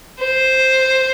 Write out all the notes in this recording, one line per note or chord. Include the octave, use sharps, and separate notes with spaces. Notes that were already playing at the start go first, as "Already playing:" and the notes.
C5